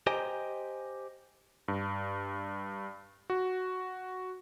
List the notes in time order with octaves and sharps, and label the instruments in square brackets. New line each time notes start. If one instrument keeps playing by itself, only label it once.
[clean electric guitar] G4 C5 D#5 G5 G#5 A#5
[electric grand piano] G2
F#4